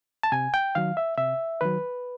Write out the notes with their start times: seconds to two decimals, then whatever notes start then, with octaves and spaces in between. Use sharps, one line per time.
0.23 A5
0.32 C3 G#5
0.54 G5
0.75 D#3 F#3 F5
0.97 E5
1.18 C3 E5
1.61 D#3 F#3 B4